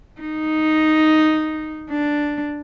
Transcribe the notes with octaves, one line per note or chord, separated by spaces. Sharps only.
D#4
D4